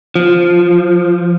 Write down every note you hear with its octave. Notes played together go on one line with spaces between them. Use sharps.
F3